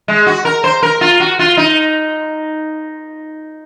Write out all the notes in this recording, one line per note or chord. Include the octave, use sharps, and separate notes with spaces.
G#3
F#4
A#4
C5
A#4
F4
F#4
F4
D#4